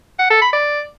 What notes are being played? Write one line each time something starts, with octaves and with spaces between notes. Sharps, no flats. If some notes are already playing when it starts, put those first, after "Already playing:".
F#5
A4
B5
D5